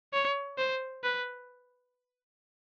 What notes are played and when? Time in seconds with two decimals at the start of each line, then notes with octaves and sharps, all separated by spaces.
0.13 C#5
0.58 C5
1.04 B4